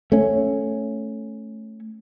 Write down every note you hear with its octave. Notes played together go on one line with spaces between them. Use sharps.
A3 C#4